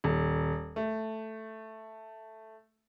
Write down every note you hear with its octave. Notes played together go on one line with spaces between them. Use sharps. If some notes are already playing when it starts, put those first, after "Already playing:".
D#1
A3